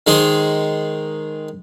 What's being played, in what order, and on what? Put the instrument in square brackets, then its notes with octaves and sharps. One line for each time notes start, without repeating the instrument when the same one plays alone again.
[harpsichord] D#3 G#3 D#4 G#4 C5